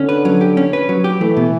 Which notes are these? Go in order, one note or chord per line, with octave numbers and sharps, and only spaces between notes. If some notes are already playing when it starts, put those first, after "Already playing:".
Already playing: D3 C#4
B4
F#3
G4
C#4
B4
F#3
G4
E3 A3
B2